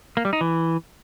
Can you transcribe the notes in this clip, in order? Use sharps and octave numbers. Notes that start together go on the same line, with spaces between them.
A#3
G3
D#4
E3